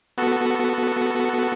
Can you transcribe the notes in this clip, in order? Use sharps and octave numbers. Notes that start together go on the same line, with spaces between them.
B3 F#4 A4